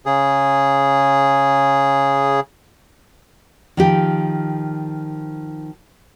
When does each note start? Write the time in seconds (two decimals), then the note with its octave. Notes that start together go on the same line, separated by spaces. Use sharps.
0.06 C#3 G#4
3.77 D#3 F3 G4